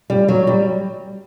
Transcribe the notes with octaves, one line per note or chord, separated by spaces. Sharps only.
G3
F#3
G3